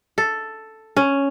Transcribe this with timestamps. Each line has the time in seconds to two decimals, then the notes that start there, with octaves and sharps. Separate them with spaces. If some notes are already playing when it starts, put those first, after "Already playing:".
0.18 A4
0.96 C#4